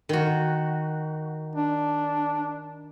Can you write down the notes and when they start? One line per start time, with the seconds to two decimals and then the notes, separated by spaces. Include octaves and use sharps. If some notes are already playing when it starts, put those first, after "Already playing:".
0.09 D#3 F#4
1.55 D4